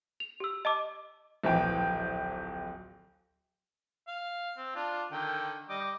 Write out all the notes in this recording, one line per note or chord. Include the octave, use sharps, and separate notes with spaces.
F7
G4 E6
D#5 A5 D6
D1 A#1 E3 G5
F5
C4
D4 F4
D3 D#3 G5
G3 D#5 D6